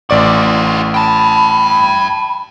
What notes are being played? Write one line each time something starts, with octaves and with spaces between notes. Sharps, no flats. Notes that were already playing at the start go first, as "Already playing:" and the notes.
A1 F4 F#4 D5 D6
G5 A5 B5